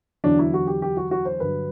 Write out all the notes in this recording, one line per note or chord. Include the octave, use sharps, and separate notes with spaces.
E2 D3 F#3 D4
E4
F#4
G4
G4
F#4
F#4
C5
G2 D3 F#3 B4